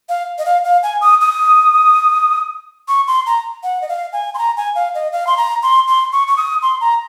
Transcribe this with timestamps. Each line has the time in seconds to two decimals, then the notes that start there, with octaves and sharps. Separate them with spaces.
0.09 F5
0.38 D#5
0.46 F5
0.64 F5
0.83 G#5
1.01 D#6
1.21 D#6
2.88 C#6
3.08 C6
3.26 A#5
3.63 F#5
3.82 D#5
3.89 F5
4.13 G#5
4.34 C6
4.38 A#5
4.57 G#5
4.75 F5
4.95 D#5
5.12 F5
5.27 C6
5.37 A#5
5.62 C6
5.88 C6
6.12 C#6
6.28 C#6
6.37 D#6
6.62 C6
6.81 A#5